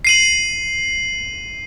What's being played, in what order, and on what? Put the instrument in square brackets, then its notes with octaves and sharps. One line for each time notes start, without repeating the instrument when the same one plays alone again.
[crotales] C7 D#7 F#7